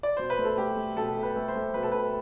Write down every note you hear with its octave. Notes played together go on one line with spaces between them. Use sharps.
D5
B2 C5
B4
A3
A4
A3 G4
A3
B2 A4
A3
B4
A3
C5
A3
B2 B4
A4
A3 B4